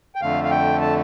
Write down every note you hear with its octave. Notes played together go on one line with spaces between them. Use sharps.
G5
F2 D3 A3 F5
F5
G5
A5